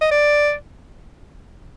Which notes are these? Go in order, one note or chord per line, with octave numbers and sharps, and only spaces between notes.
D#5
D5